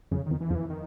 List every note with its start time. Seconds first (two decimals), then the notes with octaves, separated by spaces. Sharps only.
0.11 F#2 C#3
0.26 F2 D#3
0.41 E3
0.50 F2 F3
0.55 E3
0.70 D#3